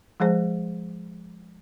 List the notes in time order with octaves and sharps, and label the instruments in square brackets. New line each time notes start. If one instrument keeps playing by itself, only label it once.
[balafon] F3 G#3 G#4 C5